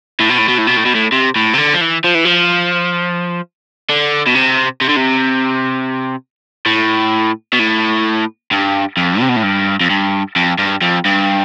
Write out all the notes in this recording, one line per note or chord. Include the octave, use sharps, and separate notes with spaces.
A2
B2
A2
B2
A2
B2
A2
B2
A2
C3
A2
C3
D3
F3
E3
F3
E3
F3
D3
B2
C3
C3
D3
C3
A2
B2
A2
G2
F2
C3
B2
A2
G2
F2
G2
F2
G2
F2
G2